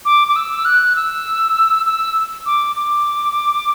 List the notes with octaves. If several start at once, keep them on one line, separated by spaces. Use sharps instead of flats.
D6
D6
E6
F#6
E6
E6
D6
D6